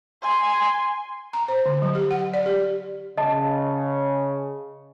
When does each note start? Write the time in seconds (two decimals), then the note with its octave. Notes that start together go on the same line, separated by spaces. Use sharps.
0.22 G#5 C6
1.33 A#5
1.48 C5
1.66 D3
1.82 F#3
1.95 G4
2.11 F#5
2.34 D5
2.46 G4
3.18 C#3 D#5 A5